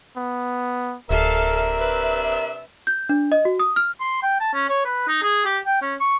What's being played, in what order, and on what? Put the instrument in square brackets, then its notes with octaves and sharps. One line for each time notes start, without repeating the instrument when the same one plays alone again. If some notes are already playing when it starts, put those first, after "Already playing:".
[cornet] B3
[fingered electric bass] D1 [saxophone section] C3 D4 E5 [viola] A4 F5 [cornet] A#4
[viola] B4
[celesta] G6
D4
D#5
F#4
D#6
F6
[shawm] C6
G5
A5
C#4
C#5
B4
D#4
G#4
G4
G5
C#4
C#6